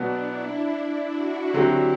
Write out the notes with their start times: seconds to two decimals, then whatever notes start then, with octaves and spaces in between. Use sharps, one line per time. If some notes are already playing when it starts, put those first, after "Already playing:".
Already playing: B2 F#3 B3 D4 F#4
0.23 E4
0.67 E4
1.10 F#4
1.54 D3 F#3 C4 E4 G4